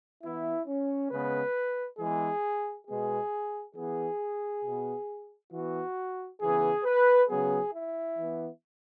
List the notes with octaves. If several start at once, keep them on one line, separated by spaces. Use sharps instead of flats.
E3 B3 E4
C#4
C#3 G#3 B3 B4
E3 G#3 B3 G#4
B2 G#3 B3 G#4
E3 B3 G#4
B2 B3
E3 B3 F#4
C#3 E3 B3 G#4
B4
C#3 F#3 B3 G#4
E4
E3 B3